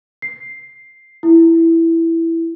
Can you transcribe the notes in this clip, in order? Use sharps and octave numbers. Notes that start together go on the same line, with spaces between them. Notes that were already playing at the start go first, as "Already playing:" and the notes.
C7
E4